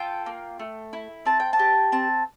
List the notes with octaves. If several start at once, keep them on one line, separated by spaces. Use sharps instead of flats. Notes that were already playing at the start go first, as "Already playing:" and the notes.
Already playing: F4 A4 G5
A#3
A3
E4
C4 A5
G5
A5
G4
C4 A5